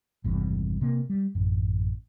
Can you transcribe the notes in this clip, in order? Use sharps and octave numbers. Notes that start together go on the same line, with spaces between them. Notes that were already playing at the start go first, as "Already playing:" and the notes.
G#1 E2 G2 C3
C3 A#3
G3
A1 F#2